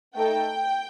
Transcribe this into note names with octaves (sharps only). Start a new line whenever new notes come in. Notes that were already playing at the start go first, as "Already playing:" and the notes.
A3 D#4 A4 G5